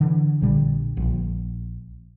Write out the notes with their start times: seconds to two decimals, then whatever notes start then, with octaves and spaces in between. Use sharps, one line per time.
0.01 D3 E3
0.41 A#1 A#2 D3 G3
0.97 A#1